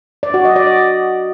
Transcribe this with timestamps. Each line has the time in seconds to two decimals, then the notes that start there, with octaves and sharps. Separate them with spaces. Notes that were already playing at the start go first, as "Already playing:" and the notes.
0.23 D5
0.34 F#4
0.45 D#5
0.56 D5